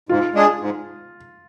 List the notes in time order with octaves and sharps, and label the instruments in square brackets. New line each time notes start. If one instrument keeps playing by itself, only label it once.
[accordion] G#2 [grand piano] F4
[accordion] G#3 D4 G#4
G#2